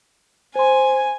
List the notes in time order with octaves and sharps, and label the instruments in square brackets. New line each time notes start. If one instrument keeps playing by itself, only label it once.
[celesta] C5 C6 [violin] G#5